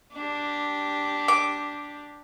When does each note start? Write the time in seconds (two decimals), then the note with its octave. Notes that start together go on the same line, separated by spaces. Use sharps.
0.13 D4 G4
1.28 D6